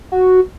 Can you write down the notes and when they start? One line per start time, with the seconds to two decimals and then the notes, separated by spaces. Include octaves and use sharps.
0.12 F#4